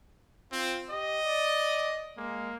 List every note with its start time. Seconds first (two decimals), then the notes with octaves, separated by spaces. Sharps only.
0.52 C4 F4
0.91 G4 D#5
1.25 D5
2.18 G#3 A#3